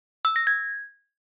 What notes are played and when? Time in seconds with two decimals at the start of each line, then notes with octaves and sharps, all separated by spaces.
0.25 E6
0.36 A#6
0.47 G#6